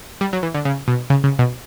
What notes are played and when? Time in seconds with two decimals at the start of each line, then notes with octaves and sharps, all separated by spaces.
0.21 G3
0.33 F#3
0.43 E3
0.54 D3
0.65 C#3
0.88 B2
1.10 C#3
1.24 C#3
1.39 B2